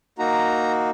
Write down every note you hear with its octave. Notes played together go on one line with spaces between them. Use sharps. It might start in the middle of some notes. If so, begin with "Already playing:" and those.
A#3 D#4 F#4 A#5